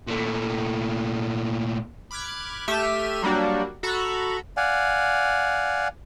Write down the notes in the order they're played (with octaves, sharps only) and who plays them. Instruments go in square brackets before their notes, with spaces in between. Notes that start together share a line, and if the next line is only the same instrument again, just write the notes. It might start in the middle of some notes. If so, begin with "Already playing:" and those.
[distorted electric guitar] A#2 A3
[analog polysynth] B5 D6 F6 F#6 G#6
A3 G4 E5 F6 D#7 E7
F#3 G3 A#3 D4 F#4
F#4 A4 A#5 B5 C#6
[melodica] D5 F5 F#5 G#5